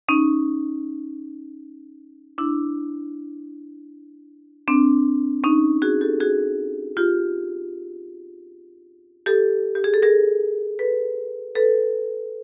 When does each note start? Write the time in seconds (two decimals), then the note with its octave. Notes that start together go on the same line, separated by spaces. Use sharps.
0.09 C#4 D#4
2.38 D4 E4
4.68 C4 D4
5.44 C#4 D#4
5.82 F#4 G#4
6.01 G4 A4
6.20 F#4 G#4
6.97 F4 G4
9.26 G4 A4
9.75 G4
9.84 G#4
9.94 A4
10.02 G#4 A#4
10.79 A4 B4
11.55 A4 B4